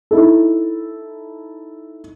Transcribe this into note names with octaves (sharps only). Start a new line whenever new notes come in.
D#4 E4 A4